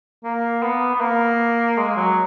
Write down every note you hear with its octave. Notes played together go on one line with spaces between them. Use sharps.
A#3
B3
B3
A#3
G#3
F#3